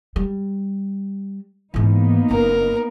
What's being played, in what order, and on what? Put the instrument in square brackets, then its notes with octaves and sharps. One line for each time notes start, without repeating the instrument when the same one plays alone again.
[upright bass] G3
[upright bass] G#2 E3 [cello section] A#3 B3 D#4
[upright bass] F#1 C4 [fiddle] A#4